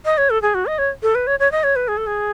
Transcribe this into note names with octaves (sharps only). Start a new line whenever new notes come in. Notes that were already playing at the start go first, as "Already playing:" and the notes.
D#5
C#5
A4
G#4
F#4
D#5
C#5
A4
B4
C#5
C#5
D#5
C#5
B4
G#4
A4
G#4